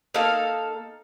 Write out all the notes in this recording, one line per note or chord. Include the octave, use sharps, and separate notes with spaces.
A#3 D#4 A4 F5